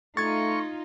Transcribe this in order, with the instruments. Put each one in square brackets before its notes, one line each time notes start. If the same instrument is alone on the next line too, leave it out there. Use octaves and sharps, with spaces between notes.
[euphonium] A3 [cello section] D#4 F4 [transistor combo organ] C#6 [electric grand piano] G#6 A6